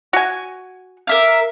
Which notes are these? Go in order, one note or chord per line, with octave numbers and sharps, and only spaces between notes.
F#4 G#5
A#4 E5 F5